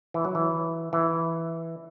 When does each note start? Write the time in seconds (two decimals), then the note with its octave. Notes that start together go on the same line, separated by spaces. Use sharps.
0.14 E3
0.25 F#3
0.35 E3
0.93 E3